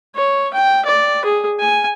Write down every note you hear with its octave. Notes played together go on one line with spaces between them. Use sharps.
C#5
G5
D5
G#4
G#5